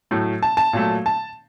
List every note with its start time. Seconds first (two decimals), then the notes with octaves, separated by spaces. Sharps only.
0.11 A2 F#3 A3
0.43 A5
0.57 A5
0.73 A#2 F#3 A3
1.06 A5